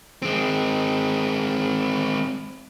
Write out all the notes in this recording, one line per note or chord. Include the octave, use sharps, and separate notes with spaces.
G#3 C4